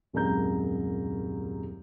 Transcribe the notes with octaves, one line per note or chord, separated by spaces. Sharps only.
D#1 C2 F#2 G#3 A#5 G6